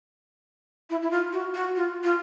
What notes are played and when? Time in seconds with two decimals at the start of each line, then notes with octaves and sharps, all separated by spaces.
0.90 E4
1.02 E4
1.11 F4
1.33 F#4
1.54 F#4
1.76 F4
2.04 F4